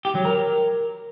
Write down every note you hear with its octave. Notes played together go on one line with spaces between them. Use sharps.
G4
F#3
A#4